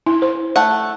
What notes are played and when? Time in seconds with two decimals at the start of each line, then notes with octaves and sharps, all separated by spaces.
0.06 E4
0.22 C5
0.56 A3 F#5